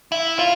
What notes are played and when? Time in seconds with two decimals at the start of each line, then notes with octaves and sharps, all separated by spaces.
0.12 E4
0.39 F4